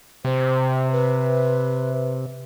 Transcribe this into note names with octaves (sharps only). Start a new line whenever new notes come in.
C3 C5
B4